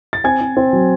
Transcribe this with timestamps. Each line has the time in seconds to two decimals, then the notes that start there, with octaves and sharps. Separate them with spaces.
0.13 A6
0.24 C4 G#5 G#6
0.41 C4
0.57 C4
0.73 F#3